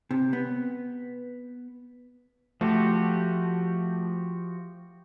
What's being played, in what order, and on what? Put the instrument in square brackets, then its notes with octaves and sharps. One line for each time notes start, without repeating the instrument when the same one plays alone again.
[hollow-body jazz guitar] C3
B3
[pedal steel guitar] F3 F#4 G4 [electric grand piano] A3